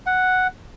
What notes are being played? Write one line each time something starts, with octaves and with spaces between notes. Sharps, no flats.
F#5